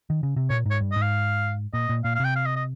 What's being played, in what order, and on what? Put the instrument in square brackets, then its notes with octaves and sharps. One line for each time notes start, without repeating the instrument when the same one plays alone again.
[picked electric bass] D#3
C#3
C3
[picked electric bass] A#2 [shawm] C#5
[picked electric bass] G#2 [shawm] C#5
[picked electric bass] G2
[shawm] D#5
[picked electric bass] G#2
[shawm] F5
[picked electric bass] A#2 [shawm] D#5
[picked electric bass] A#2
[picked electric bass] A#2 [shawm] F5
[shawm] F5
[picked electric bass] C3
[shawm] G5
F5
D#5
D#5